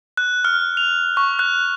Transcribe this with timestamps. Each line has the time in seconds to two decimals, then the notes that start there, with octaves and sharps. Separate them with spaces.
0.17 F#6
0.45 F6
0.77 F7
1.17 C#6
1.39 F#6